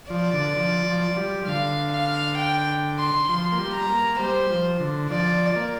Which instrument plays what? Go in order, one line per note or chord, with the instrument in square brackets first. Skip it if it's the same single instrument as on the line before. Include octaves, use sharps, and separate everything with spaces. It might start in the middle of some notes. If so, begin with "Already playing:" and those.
[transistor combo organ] F3 [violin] D5
[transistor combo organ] D3
F3
F3
F3
G3
F3
[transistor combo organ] D3 [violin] F5
[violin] F5
G5
C6
[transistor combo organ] F3 [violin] C6
[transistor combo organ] A#3
G3
[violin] A#5
[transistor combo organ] A#3
[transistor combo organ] G3 [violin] C5
[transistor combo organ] F3
D3
[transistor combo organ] F3 [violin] D5
[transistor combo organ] A#3